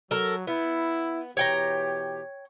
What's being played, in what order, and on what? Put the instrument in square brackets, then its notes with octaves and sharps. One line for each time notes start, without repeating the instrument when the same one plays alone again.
[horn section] F#3 [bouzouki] A4 A#4
[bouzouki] B3 [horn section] E4
[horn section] B2 E3 G4 [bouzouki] C#5 G5 A#5